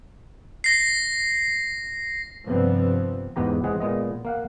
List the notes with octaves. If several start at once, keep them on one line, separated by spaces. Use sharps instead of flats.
A#6 C7
G2 C3 F3 G3 B3 C4
E2 G#2 B3 G4 A#5
E3 G#3 C4 G#4 F#5
A#2 G#3 B3 D#5
A#3 F5 F#5